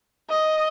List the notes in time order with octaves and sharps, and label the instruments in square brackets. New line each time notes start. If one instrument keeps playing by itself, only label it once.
[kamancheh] D#5